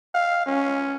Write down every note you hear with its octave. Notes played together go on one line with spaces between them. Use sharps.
F5
C#4